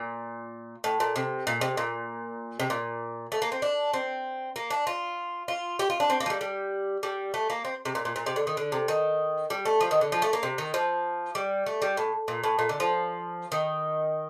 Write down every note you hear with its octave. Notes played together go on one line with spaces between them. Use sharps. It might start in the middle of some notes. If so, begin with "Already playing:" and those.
Already playing: A#2
A2
A#2
C3
A#2
C3
A#2
C3
A#2
A3
A#3
C4
D4
C4
A#3
D4
F4
F4
G4
F4
D4
C4
A#3
F3
G3
G3
G3
A3
A#3
C4
C3
A#2
A#2
A#2
C3
D3
D#3
D3
C3
D#3
G3
A3
F3
D#3
D3
F3
A3
A#3
C3
D#3
F3
G3
A3
G3
A2
A#2
A2
A#2
D3
F3
D#3